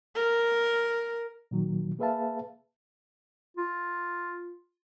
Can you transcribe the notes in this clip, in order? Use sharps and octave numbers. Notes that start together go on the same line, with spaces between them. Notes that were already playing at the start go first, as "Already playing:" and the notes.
A#4
A#2 D#3 F#3
A#3 G#4 B4 E5 F5 A5
F4